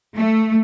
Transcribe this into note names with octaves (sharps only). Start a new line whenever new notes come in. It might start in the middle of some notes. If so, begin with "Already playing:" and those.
A3